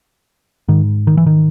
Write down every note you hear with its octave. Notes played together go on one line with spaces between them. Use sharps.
G#2 D#3
D#3
E3
D#3